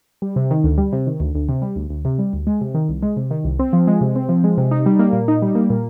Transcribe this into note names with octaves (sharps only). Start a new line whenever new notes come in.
G3
C3
D#3
D2
G3
C3
D#3
D2
D2
C3
G3
D2
D2
C3
G3
D2
G#3
C3
D#3
C2
G#3
C3
D#3
C2
C4
F3
G#3
C3
C4
F3
G#3
C3
D#4
G3
A#3
A#2
D#4
G3
A#3
A#2